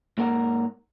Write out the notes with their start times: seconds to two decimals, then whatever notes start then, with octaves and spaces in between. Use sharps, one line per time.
0.18 G#2 A#3 A#4 F#5 A#5